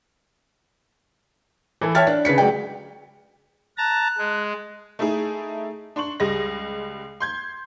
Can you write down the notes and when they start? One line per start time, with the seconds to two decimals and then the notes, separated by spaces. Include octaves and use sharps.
1.81 E3 E4 A4
1.95 C#5 E5 G5 A5 F6 A6
2.07 D4
2.25 C#3 B4 B6 C#7
2.38 F#3 G#3 D5 G5
3.78 A5 A#5 F#6
4.18 G#3
4.99 A3 D#4 E4 G#4
5.96 D4 C6 C#6 F#7
6.20 C#2 G3 G#3 D#5 A#6
7.20 C6 G6 G#6